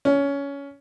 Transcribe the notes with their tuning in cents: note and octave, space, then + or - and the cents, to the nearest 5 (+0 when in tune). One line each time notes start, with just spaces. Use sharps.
C#4 +20